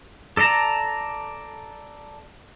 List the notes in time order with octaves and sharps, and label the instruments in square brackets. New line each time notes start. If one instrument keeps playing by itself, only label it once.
[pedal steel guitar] A4 D5 A5 A#5